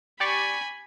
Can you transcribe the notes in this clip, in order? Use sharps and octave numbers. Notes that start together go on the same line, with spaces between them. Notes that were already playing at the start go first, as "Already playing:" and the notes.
G4 D5 G#5 B5 C#6